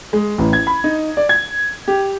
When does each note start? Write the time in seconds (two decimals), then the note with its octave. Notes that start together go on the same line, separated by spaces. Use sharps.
0.13 G#3
0.38 A1
0.53 G#6
0.67 B5
0.84 D#4
1.17 D5
1.29 G#6
1.88 G4